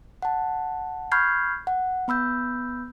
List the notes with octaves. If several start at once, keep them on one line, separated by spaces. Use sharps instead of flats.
F#5 A5
B5 C#6 F6 G6 G#6 C7
F#5
B3 B5 E6 G6